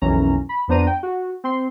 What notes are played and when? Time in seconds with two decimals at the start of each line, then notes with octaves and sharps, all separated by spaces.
0.02 B1 F2 E3 A#3 C#4 A#5
0.49 B5
0.68 F2 B3 D4 C5 A#5 D#7
0.87 G5
1.03 F#4
1.44 C4 C6